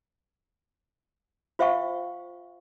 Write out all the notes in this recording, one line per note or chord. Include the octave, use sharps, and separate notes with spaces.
F4 C5 E5 F5 G5 C#6